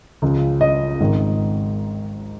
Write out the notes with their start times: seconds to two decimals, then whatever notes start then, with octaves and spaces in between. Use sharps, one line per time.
0.22 C#2 C#3 F3
0.61 D#5
1.01 G#1 G#2 D#3